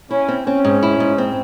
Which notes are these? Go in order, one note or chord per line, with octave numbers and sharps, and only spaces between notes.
C#4 E4
C4
C4 C#4
G#2
E4
G#2
C4